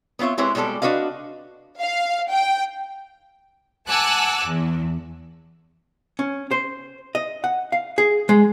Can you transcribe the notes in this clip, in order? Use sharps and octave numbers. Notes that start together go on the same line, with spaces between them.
B3 C4 F4 C#5 E5
G#3 C4 E4 G4 B4 C#5
B2 G3 G#3 A4 D5
D4 F#4 B4 D#5 F5
F5
G5
F#5 G#5 A5 D6 E6 F#6
E2
C#4
C5
D#5
F#5
F5
G#4
G#3